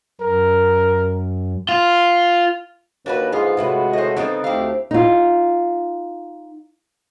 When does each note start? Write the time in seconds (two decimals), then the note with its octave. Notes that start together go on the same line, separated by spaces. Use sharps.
0.21 F#2 A#4
1.69 F4
3.06 D#2 D4 F#4 B4
3.32 G#2 D3 B3 F4
3.57 A2 C3 G#3 E4 F#4 B4
3.93 A2 C5 D#5
4.17 C#3 B3 C4 D4 D#4 A4
4.44 D2 A3 E4 G4 F5
4.91 D#4 F4